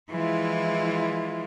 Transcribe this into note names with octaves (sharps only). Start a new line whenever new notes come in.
E3 F3 G#3 E4 F4